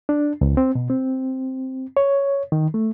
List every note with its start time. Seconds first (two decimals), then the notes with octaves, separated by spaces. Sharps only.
0.09 D4
0.41 C#2
0.57 C4
0.75 B2
0.90 C4
1.97 C#5
2.52 D#3
2.74 A3